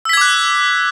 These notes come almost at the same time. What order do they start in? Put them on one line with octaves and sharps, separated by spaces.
E6 B6 G#6 D6 F#6